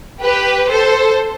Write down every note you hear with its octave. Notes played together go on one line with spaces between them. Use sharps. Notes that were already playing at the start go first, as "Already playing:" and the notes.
G4 B4
A4 C5